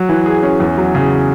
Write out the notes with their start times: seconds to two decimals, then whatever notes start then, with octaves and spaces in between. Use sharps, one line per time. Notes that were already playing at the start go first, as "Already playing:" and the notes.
Already playing: F#3
0.09 E3
0.26 G#4
0.43 C#4
0.60 E2
0.77 F#3
0.95 C#3